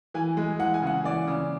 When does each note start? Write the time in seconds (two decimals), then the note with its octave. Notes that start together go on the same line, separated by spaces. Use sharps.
0.14 E3 G#5
0.37 G#3
0.59 E3 F#5
0.74 G#5
0.82 C#3 F#5
1.04 E3 D5
1.27 C#3